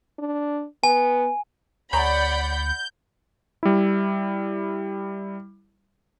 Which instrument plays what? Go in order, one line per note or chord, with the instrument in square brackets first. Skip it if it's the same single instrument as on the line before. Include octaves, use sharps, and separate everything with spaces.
[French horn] D4
[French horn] B3 [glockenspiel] G#5
[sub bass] D2 [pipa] G#4 C#5 A#5 [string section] D5 F#5 B5 [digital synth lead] G6
[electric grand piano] G3 E4